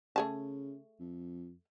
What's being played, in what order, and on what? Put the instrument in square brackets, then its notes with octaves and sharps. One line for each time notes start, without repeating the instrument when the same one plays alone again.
[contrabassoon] C#3 [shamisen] A3 G#4 A5
[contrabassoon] F2